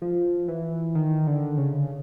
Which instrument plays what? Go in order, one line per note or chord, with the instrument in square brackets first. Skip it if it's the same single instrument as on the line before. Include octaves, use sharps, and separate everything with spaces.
[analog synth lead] F3
E3
D#3
D3
C#3